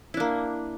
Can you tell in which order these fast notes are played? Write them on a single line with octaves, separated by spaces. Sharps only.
E4 D4 A#3